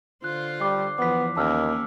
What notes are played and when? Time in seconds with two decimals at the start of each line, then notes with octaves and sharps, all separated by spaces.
0.24 D3 F4 C5 F#6
0.60 G3 D6 C7
0.98 E2 F3 B3 D6 B6
1.36 D#2 A#3 C#4 A5 E6 F6